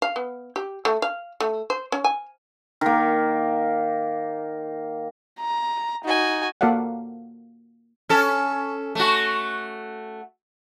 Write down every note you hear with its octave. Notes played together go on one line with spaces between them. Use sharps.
F5
B3
G4
A3
F5
A3
C5
C#4
G#5
D#3 A#3
A#5
D#4 F#4 G#5
A#3 F#4 A4 D5 F5 F#5
C#4 A4
A3 F#4